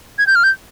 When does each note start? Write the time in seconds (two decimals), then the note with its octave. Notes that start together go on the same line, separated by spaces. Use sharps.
0.19 G#6
0.27 G6
0.36 F6
0.44 G6